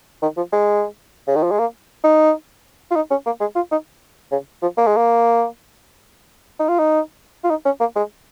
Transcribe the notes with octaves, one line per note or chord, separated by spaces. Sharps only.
D#3
F3
G#3
C#3
D#3
F3
G#3
A#3
D#4
F4
D#4
C#4
A#3
G#3
F4
D#4
C#3
F3
A#3
G#3
A#3
D#4
F4
D#4
F4
D#4
C#4
A#3
G#3